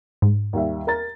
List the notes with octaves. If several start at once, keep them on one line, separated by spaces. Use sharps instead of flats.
G#2
D#2 G3 E5
A#4 A#5 A6